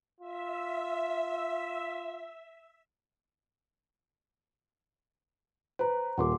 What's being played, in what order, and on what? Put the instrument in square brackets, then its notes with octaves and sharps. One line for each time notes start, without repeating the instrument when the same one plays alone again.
[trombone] F4 [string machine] E5
[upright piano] B4 [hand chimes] C5 A#5
[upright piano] D#1 A#3 [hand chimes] F#5 C6 D6